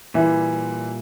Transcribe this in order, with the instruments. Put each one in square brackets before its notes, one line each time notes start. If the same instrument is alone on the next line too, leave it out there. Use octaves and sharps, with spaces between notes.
[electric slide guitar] A#2 G3 A#3 [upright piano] E3